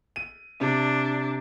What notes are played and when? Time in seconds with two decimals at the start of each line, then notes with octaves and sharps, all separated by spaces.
0.16 D#7
0.61 C3 D4